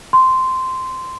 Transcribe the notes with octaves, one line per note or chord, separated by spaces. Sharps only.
C6